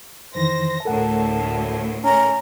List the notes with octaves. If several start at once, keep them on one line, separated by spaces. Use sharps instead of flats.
F2 D#3 E3 C5 A#6
D2 A2 A4 A#4 F#5 A5
C#4 A#5